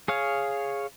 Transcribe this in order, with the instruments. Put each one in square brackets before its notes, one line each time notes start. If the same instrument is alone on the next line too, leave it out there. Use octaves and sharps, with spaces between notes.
[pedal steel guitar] G#4 C#5 F5